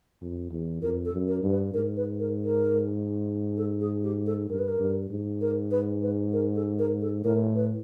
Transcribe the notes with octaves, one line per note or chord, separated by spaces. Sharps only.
F2
E2
F2 A#4
A4
F#2
A#4
G2
B4
G#2 A#4
B4
A#4
A#4
A4
G#4
G4
A4
G2 A#4
B4
A#4
G2
G#2
A#4
B4
B4
A#4
A4
A#4
A4
A2 A#4
B4